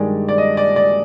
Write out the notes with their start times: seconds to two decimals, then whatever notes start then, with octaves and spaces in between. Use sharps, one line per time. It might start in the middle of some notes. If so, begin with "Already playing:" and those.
Already playing: G2 D#3 G#3 D5
0.28 D5
0.38 D#5
0.57 D5
0.76 D5